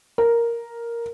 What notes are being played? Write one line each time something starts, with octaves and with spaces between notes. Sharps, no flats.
A#4